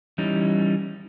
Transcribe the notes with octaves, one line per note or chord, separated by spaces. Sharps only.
E3 G3 C#4 D#4